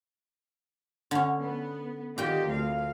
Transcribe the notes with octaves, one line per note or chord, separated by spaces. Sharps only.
D3 C#4
B3
A#2 D#3 C4 G4 G5
D2 F5